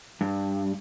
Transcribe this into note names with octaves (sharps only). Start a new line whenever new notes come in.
G2